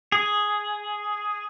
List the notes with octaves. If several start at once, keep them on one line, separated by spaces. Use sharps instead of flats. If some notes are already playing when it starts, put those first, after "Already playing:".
G#4